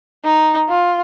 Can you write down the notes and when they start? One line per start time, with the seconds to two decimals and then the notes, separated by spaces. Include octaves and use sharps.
0.24 D#4
0.69 F4